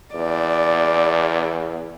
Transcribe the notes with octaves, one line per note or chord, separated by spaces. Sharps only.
E2 D5